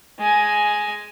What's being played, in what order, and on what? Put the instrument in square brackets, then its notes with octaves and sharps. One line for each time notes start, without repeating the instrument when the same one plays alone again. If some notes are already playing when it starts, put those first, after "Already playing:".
[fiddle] G#3 G#5